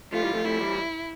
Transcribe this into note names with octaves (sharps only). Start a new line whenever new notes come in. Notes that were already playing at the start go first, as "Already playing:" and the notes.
F3 A3 F4
E3 G3
F3 A3
F3 A3 E4
E3 G3